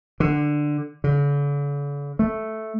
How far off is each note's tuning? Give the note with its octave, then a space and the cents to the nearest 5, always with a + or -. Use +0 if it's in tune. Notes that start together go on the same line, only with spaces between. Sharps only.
D3 +10
D3 -45
A3 -5